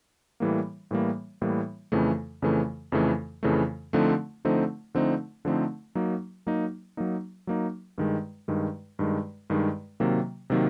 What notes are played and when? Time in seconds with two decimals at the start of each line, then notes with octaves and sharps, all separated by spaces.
0.40 A2 E3 G3 A#3
0.91 A2 E3 G3 A#3
1.42 A2 E3 G3 A#3
1.92 F2 C#3 E3 A3
2.42 F2 C#3 E3 A3
2.92 F2 C#3 E3 A3
3.43 F2 C#3 E3 A3
3.93 D3 F3 A3 C4 D#4
4.45 D3 F3 A3 C4 D#4
4.95 D3 F3 A3 C4 D#4
5.45 D3 F3 A3 C4 D#4
5.95 F#3 A#3 D#4
6.46 F#3 A#3 D#4
6.97 F#3 A#3 D#4
7.47 F#3 A#3 D#4
7.98 G2 D#3 G#3
8.48 G2 D#3 G#3
8.99 G2 D#3 G#3
9.50 G2 D#3 G#3
10.00 C3 D#3 F#3 A#3
10.50 C3 D#3 F#3 A#3